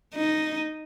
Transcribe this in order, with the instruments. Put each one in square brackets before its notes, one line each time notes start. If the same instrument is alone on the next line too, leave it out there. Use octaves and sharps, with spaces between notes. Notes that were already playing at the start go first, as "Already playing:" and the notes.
[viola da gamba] D#4